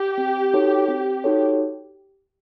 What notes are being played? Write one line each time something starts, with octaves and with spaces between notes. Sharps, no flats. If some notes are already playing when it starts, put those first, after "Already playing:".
Already playing: G4
C4
D#4 F#4 A4 C#5
C4
D#4 F#4 A4 C#5